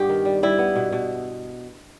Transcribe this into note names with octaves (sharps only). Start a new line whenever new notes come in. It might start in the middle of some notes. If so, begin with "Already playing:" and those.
Already playing: G2 B3 G4
D#3
G3
G3 E4
B3
B2
B2